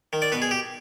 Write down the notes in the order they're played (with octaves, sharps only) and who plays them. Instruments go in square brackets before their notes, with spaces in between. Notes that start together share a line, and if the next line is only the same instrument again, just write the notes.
[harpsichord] D#3
D5
B2 B4
G#4
G4